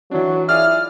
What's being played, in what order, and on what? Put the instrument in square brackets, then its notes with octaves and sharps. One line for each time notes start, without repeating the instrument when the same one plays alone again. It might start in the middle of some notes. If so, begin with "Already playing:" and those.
[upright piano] E3 D4 [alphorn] F#3
[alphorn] E4 [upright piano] F4 G#4 D5 [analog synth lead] F6